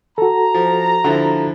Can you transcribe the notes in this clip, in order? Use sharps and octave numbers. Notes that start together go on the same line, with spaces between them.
F#4 A4 A#5
F3
D3 F3 E4